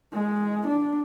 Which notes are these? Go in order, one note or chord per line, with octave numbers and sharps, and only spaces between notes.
G#3
D4